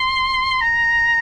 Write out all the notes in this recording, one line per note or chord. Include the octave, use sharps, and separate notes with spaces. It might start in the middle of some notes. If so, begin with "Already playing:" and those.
Already playing: C6
A#5